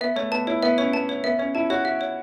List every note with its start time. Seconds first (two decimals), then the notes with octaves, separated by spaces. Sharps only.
0.01 B3 E5
0.16 A3 C#5
0.31 B3 A5
0.47 E4 C#5
0.63 B3 E5
0.78 C#4 C#5
0.93 B3 A5
1.09 C#5
1.24 B3 E5
1.39 C#4 C#5
1.55 E4 A5
1.70 F#4 C#5
1.85 F#4 E5
2.01 C#5